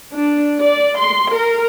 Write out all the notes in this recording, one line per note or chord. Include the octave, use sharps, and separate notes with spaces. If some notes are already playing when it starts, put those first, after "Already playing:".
D4
D5
C6
A#4